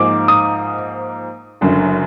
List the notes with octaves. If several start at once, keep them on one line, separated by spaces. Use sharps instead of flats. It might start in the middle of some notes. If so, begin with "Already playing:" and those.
Already playing: G#2 F3 A#3 D#4 G#4 D6
D#6
F#1 F#2 D3